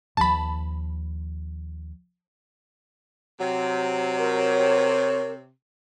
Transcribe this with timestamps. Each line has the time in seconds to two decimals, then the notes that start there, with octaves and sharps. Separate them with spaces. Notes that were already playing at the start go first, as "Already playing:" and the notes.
0.17 D#2 F3 A5 B5
3.40 C3 F#3
4.19 A#4 C#5